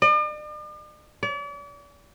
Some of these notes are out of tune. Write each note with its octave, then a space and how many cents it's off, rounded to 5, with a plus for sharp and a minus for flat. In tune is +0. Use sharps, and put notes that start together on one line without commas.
D5 +45
D5 -40